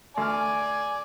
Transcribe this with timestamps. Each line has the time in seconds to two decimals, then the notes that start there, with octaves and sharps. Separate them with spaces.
0.17 D2 D5 G#5 F6